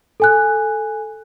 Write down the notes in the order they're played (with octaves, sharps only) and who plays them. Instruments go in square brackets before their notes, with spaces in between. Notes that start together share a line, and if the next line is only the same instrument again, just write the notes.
[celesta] A4 G#5 F#6